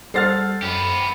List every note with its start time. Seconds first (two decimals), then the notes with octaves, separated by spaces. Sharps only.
0.14 G3 A4 C5 F#5 F6 A6 C7
0.62 F#2 B3 G4